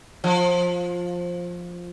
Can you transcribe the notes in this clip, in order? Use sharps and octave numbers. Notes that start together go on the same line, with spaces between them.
F3